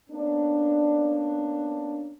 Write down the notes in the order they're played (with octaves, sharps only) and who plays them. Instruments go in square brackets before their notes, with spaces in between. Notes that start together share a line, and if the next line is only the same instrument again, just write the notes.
[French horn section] A#3 B3 C#4 D4